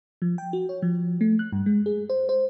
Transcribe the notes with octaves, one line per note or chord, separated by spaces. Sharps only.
F3
G5
F#4
C#5
F3
A3
F#6
G2
G#3
G#4
C5
C5